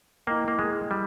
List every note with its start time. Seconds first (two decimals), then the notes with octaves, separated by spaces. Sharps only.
0.27 A#3 E4 A#4 D#5 G5
0.48 A#3
0.59 G#3
0.91 G3